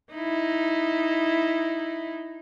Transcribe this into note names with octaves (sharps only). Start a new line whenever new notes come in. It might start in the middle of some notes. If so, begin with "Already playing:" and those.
D#4 E4